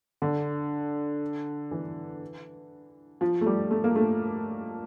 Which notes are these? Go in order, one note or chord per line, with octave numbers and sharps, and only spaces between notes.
D3
E3
F3
A3
G3
A3
A#3
A3